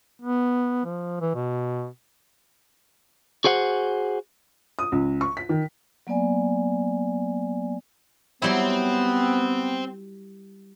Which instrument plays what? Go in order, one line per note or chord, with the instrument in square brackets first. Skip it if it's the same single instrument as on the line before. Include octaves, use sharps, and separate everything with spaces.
[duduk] B3
F3
E3
B2
[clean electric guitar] F#4 G#4 C5 F#5
[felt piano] D#6
C#2
C#6
B6
D#3
[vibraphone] F#3 A#3 B3 D5 G#5
[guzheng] F#3 G3 E4 [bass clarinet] B3 [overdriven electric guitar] C4